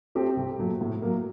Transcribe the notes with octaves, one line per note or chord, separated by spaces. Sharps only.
A3 C4 G4
C2
A#2 F#3 A3
A2
F#3 A#3